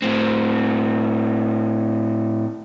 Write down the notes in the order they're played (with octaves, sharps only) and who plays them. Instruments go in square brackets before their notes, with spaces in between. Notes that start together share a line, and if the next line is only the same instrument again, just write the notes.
[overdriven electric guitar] A2 C4